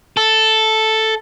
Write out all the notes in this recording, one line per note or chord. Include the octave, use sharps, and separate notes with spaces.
A4